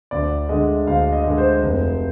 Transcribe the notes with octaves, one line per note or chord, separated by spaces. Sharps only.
D2 D5
D3 G#3 D#5
D2 F5
D#5
D3 G#3
C5
F1